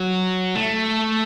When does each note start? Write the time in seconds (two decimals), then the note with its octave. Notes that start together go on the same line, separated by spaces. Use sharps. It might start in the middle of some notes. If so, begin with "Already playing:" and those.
Already playing: F#3
0.56 A3